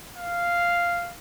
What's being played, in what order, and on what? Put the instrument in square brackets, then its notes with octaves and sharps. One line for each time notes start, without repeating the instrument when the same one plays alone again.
[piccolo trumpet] F5